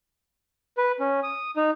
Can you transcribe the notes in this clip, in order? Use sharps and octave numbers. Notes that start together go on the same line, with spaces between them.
B4
C#4
D#6
D#4